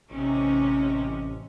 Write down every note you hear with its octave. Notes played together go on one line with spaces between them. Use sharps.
A1 C3 C#4 D#4